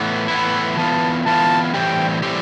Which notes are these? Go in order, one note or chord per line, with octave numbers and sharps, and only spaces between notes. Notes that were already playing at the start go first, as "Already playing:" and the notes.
Already playing: A2 E3 B3
A2 E3 B3 E4 B4
E3 B3 F4 A5
E3 B3 F4 A5
A2 E3 G3 C4 G4 G5
A2 E3 G3 C4 G4